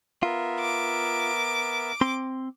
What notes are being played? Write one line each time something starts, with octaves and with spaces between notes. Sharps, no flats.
B3 F4 A#4 E5
D6
C4 C6